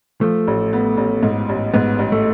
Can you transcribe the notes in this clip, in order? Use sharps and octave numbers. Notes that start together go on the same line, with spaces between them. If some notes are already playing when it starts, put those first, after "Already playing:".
F3 A3
A1
B3
A1
G#2
A1
G#2 B3
A1
A3